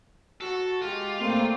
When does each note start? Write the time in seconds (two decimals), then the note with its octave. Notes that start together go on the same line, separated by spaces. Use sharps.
0.41 F#4 A4
0.82 G#3 F4 G4
1.20 A#2 A3 A#3 C4 D5 G5